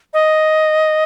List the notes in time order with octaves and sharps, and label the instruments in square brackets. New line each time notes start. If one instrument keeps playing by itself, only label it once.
[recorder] D#5